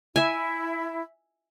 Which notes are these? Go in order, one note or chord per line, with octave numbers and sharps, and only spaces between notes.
E4 E5 G#5